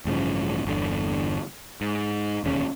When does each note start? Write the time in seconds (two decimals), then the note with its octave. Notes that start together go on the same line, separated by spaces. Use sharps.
0.05 A1 G2 C#3 F3
0.65 G1 E2 D3
1.81 G#2
2.44 E1 D#2 C#3 C#4